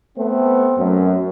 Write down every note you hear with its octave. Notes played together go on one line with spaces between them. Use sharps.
A3 B3 C4
F#2